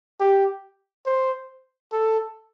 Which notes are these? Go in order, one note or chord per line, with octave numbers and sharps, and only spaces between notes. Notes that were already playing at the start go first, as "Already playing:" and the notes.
G4
C5
A4